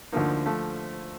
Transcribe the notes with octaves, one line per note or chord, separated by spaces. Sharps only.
D2 D3 F3 A#3 D#4
F3 A3